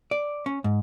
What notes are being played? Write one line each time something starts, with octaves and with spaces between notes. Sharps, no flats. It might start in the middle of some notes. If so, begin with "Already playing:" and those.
D5
C#4
G#2